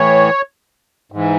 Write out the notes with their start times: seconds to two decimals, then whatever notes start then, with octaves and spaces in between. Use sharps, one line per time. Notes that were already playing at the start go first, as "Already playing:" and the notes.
Already playing: A2 E3 C#5
1.12 G#2 E3